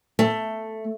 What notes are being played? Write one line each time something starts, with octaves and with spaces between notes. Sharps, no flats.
A3